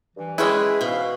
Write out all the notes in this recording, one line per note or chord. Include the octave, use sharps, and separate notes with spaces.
G2 E3
G#3 C#4 E4 G#4 B4 E5 G5
G#2 B2 E3 F5